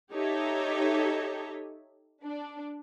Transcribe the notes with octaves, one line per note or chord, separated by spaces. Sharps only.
D#4 G4 A4 C#5 D#5 E5
D4